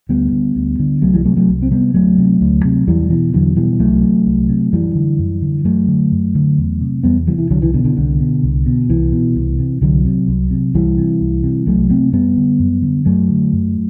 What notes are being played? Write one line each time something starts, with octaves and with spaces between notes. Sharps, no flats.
D2 G3 B3
D3
D2
D3
C2 F#3 A3
E3 G3
C3 F#3 A3
F#3 A3
C2
C4
C3 G3 B3
D2 F#3 A3
C3
D2
C3
E2 E3 G3
B2 E3
E2 D3 F#3
B2 E3 G3
C2 F#3 A3
C3
C2
C3
F#2 E3 G3
D3
F#2
D3
F#2 F#3 A3
D3
F#2
D3
E2
C3
E2 G3 B3
C3 E3 G3
E3
C2 D3 F#3
E3
B2 D3
D3
C2 D3
B2
C2
B2
C2 E3
B2
C2
C3
C2 D3 F#3
C3
C2
C3
C2 E3 G3
C3
C2
C3
C2 F#3 A3
C3 A3 C4
F#2 G3 B3
D3
F#2
D3
F#2 F#3 A3
D3
F#2